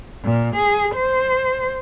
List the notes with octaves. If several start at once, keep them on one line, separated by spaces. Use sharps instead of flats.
A#2
G#4
C5